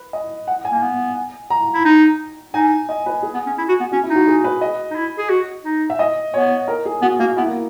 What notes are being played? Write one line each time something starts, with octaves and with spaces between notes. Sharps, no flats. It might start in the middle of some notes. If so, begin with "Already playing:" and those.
Already playing: B4
D#5
F#5
G#5
A#3
B3
A#5
E4
D#4
D#4 G#5
D#5
B4
G#4
B3
C#4
E4
F#4
B3
C#4 F#4
E4
D#4
F#4
G#4
B4
D#5
D#4
E4
G#4
F#4
D#4
E5
D#5
B3 C#5
A#4
G#4
B3 F#4
A#3 F#4
B3 E4
A#3